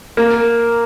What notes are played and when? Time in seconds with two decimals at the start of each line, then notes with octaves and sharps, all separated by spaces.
0.17 A#3